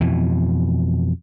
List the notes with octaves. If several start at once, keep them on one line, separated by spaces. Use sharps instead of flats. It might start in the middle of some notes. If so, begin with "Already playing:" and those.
F2 B2 E3